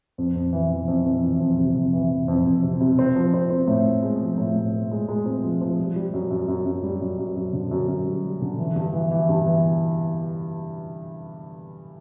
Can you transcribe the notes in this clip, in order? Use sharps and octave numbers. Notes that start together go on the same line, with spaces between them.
F2
F2
E3
E3
F2
F2
E3
F2
C3
F2
E3
E3
F2
F2
C3
C3
C4
F3
C4
C4
A2
A2
G#3
F3
A2
A2
A2
G#3
G#3
C4
F3
F3
G3
G3
F#2
F#2
F#2
F#2
G3
F#2
F#2
F#2
D3
F#2
F#2
G3
G3
D3
E3
G2
E3
E3
G2
E3